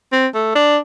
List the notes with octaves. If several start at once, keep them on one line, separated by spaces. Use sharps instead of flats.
C4
A3
D4